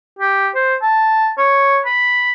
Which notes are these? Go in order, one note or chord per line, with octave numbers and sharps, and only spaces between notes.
G4
C5
A5
C#5
B5